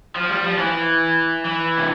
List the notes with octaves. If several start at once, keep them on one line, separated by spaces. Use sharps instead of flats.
F3
G3
F3
E3
E3
C3